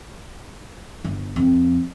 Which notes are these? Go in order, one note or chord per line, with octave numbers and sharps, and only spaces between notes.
G1
F2